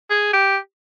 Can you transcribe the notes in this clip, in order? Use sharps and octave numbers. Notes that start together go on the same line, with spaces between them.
G#4
G4